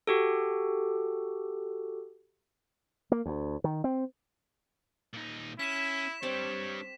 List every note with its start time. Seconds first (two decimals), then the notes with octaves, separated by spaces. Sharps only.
0.07 F#4 G4 A4
3.12 A#3
3.26 D2
3.64 D#3
3.84 C4
5.13 A#2 D#4
5.59 C#4 E4 B6 E7
6.23 G3 C4 D4 G4 C#5 G5